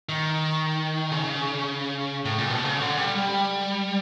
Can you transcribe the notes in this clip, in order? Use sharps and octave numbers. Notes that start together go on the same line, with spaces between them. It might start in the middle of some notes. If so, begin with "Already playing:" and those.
D#3
C#3
A2
A#2
B2
C#3
D3
G3
G3